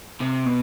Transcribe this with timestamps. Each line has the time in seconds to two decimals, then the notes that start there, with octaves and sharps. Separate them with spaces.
0.21 C3
0.46 B2